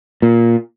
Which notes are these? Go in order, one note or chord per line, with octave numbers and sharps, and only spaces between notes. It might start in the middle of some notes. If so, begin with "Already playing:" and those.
A#2